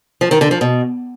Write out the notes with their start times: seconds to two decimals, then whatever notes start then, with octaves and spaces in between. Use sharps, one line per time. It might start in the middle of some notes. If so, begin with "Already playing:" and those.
0.21 F3
0.31 D#3
0.41 D3
0.51 F3
0.61 B2